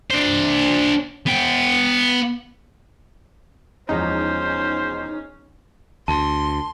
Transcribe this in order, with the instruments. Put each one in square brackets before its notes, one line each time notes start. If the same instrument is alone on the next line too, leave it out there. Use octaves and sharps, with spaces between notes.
[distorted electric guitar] D4 C5
B3 G5
[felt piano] E1 E2 F3 [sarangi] C#4 [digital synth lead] D#4 [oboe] C5
[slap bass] D2 [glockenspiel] A5 [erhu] C6